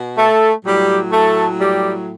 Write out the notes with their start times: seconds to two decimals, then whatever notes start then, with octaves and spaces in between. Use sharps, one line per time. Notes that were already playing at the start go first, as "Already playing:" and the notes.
Already playing: B2
0.17 A3 A4
0.65 A2 F#3 G3 G4
1.12 A3 A4
1.60 G3 G4